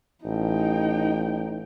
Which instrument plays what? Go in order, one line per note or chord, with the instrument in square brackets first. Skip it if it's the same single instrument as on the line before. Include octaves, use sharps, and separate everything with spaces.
[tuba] A1 [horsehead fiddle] D#4 G5